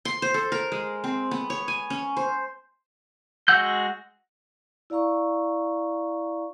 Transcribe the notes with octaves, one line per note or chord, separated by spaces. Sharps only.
C6
C5
A4
A#4
G#3
C4
B3
C#5
G#5
C#4
C5
G#3 F#4 F#5 E6 G6
E4 D5 F5 A#5 C#6